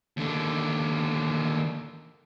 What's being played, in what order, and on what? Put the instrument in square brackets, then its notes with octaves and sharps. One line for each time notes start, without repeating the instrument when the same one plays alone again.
[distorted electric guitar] D#2 D3